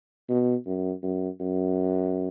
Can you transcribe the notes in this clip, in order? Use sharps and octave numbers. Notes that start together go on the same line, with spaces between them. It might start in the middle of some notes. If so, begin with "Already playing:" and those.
B2
F#2
F#2
F#2